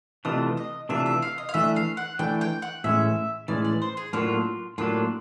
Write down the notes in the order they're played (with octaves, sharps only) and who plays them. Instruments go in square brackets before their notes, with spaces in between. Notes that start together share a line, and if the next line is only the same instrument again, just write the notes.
[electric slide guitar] C3 E3 A3 D4 F4 [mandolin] D#5
[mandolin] D#5
[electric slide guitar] C3 E3 A3 D4 F4 [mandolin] E5
[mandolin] E5
F5
D#5
F5
[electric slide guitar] E3 A3 D4 [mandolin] E5
[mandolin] F5
F#5
[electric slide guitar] E3 A3 D4 [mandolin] G5
[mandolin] G5
F#5
[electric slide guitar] A2 E3 G#3 C#4 [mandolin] E5
[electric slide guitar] A2 E3 G#3 C#4 [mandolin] D5
[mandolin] D5
C5
G#4
[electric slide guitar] A2 F#3 A#3 D4 F#4 [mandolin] F4
[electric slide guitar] A2 F#3 A#3 D4 F#4 [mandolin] F4